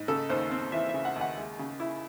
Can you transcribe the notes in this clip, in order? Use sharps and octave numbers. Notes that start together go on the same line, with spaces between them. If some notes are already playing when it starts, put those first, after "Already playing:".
Already playing: G#2
C#3 A4
D#2 C5
C4
E3 E5
C#3 E5
F#5
D#2
F#5
G#3
C#3
E4